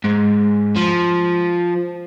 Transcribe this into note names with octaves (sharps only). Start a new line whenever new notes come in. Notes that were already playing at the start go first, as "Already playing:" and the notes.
G#2
F3